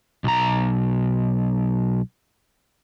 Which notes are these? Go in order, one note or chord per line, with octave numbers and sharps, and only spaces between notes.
B1 A#5